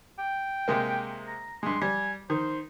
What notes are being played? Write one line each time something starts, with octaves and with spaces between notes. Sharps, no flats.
G5
C3 G#3 A#3
A#5
G2 G#3 C6
G3 G#5
D#3 C5